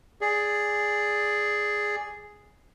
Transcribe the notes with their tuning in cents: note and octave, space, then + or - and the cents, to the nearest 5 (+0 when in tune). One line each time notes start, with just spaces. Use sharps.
G#4 +0 D5 -5